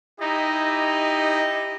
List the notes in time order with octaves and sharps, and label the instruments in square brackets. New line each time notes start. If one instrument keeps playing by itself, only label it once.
[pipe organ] D#4 [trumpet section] E4 G4 D#5